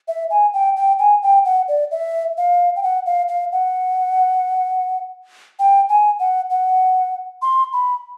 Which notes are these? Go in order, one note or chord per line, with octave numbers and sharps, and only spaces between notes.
E5
G#5
G5
G5
G#5
G5
F#5
D5
E5
F5
G5
F#5
F5
F5
F#5
G5
G#5
F#5
F#5
C6
B5